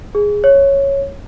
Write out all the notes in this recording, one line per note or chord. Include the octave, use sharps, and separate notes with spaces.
G#4
C#5